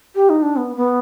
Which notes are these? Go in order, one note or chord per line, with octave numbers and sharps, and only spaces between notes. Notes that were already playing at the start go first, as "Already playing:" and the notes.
G4
D#4
D4
B3
B3